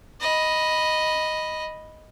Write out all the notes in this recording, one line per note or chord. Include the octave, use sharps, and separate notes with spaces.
D#5 B5